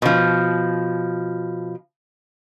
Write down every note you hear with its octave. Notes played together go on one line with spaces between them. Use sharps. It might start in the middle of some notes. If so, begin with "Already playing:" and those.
B2 F3